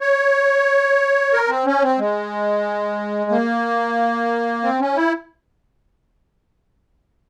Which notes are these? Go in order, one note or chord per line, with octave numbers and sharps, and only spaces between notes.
C#5
A#4
C4
C#4
C4
G#3
A#3
C4
C#4
E4